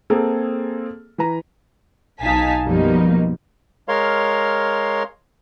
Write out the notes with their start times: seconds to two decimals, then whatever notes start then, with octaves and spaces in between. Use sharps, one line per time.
0.10 A#3 C4 G#4 A4
1.18 E3 B4 A#5
2.21 B1 D#4 F5 G#5 A5 B6
2.64 F#2 B2 F3 G3 A#3 D#4
3.88 G#3 A#4 C#5 F5 C6